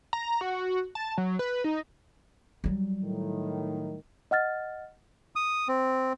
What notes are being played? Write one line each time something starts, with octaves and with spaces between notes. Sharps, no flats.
A#5
F#4
A5
F#3
B4
D#4
F#3 G3
A2 D#3
D#5 F#5 F6 A6
D#6
C4